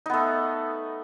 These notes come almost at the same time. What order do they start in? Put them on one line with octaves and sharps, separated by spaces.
D#4 B3 A3